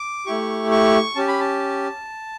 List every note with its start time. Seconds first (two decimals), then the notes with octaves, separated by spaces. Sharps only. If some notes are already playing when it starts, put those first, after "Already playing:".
Already playing: D6
0.26 A3 E4 G4 C#6
0.71 C#6
1.16 C#4 G4 A5
1.28 B5
1.40 A5